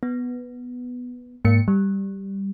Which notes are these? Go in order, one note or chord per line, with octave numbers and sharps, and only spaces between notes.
B3
G#2 A#3 C#7
G3